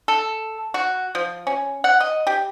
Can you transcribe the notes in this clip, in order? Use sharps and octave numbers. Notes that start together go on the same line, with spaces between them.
A4
F#4
F3
C#4
F#5
D#5
G4